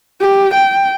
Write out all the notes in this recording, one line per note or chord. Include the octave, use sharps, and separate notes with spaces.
G4
G5